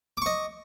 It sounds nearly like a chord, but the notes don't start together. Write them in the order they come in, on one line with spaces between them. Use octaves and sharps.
D6 C#6 D#5